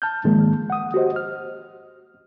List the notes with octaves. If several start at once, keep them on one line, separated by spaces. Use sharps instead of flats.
A5 F6 G6
G#2 D#3 F3 G#3 A#3
F#5 D#6
F#4 G4 C5 D#5
F6